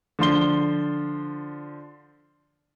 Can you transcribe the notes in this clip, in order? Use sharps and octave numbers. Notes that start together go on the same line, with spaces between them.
D3 F3 C6 G7